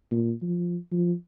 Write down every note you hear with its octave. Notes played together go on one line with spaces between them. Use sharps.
A#2
F3
F3